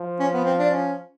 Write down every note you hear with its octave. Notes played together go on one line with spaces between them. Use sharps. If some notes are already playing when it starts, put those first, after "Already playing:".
Already playing: F3
C#4
B3
C4
D4
C#4